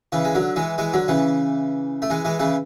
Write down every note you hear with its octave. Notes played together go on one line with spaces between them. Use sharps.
C#3 E3
G#3
D3 F#3
E3 G#3
E3 G#3
D3 F#3
C#3 E3
A3
E3 G#3
E3 G#3
C#3 E3